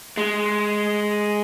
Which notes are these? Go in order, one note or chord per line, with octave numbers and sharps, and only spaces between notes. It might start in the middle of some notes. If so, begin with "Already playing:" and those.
G#3